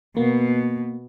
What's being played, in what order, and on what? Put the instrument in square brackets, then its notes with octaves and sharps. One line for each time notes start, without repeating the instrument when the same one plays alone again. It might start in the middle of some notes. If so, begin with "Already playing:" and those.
[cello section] B2 [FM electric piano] A#3